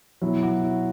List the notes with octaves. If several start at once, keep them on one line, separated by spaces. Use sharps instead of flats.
B2 F#3 E4
F#4
E4